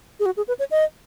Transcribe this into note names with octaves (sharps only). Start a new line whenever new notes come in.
G#4
F#4
G#4
B4
C#5
D#5